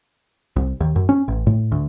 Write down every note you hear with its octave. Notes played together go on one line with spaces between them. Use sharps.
C2
D#2
F#2
C#4
A1
A2
D2